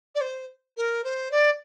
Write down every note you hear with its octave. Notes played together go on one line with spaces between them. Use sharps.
D5
C5
A#4
C5
D5